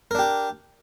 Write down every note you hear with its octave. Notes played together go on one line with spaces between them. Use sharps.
D4 G4 A#4